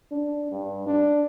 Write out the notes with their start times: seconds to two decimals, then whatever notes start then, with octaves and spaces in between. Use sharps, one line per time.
0.11 D4
0.52 G2
0.86 D4